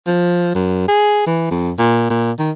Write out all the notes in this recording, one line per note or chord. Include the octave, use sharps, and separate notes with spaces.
F3
F#2
G#4
E3
F2
A#2
A#2
D#3